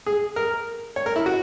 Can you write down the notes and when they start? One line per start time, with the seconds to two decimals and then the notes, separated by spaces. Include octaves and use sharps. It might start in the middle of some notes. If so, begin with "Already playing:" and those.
0.06 G#4
0.36 A#4
0.96 C#5
1.06 A#4
1.16 E4
1.26 F#4